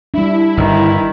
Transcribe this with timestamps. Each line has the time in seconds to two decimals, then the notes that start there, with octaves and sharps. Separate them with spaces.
0.14 G3 D4 E4
0.57 G1 D#3